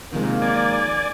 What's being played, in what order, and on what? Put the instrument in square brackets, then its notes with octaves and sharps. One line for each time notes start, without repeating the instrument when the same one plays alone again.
[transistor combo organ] C3 [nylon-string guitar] D#3 F3 G#3 [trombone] A#3
[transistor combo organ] D5 G#5